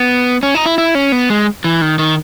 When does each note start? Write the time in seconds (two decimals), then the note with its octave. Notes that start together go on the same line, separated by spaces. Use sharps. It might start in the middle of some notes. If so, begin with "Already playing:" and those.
Already playing: B3
0.43 C#4
0.55 D#4
0.66 E4
0.78 E4
0.95 C#4
1.12 B3
1.30 G#3
1.64 E3
1.82 D#3
1.99 D#3